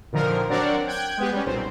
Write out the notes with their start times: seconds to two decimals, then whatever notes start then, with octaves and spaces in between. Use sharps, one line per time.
0.12 A#2 D3 D#3 F3 A#4
0.50 F#3 C4 D4 A#4 D5 F#5
0.87 G5 F#6 G#6
1.17 G#3 B3 G4
1.32 G3 C#4
1.45 B1 A#2 C4